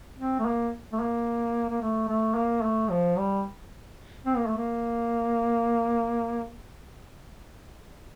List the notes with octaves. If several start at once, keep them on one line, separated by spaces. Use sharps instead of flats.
C4
A3
A#3
A3
A#3
A#3
A3
A3
A#3
A3
F3
G3
C4
A#3
A3
A#3